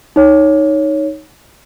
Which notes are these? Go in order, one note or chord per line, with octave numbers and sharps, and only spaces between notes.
D#4 C#5